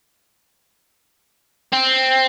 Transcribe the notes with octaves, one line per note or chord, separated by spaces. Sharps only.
C4